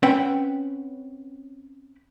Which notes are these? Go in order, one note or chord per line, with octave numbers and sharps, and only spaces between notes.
C4 C#4 B4 F#5 G5